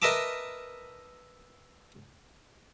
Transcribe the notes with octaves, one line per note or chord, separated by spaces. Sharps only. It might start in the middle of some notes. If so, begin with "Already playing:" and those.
A#4 B4 D#5 E5 A5 D6